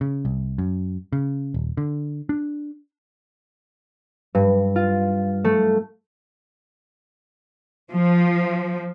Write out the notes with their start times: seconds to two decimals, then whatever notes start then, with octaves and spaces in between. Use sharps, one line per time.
0.01 C#3
0.25 C2
0.58 F#2
1.13 C#3
1.54 D#1
1.77 D3
2.29 D4
4.35 G2
4.76 F4
5.44 A3
7.92 F3